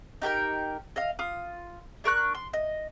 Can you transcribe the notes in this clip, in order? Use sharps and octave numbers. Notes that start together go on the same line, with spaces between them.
D#4 G4 A#4 G5
D#5 F5
F4 D#6
D4 A#4 C#6 F#6
C6
D#5